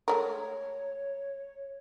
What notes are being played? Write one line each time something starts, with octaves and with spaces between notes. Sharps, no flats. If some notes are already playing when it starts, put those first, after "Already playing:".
G#3 A3 A#4 C#5